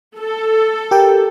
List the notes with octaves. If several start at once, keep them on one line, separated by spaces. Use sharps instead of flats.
A4
G4 A#4 G5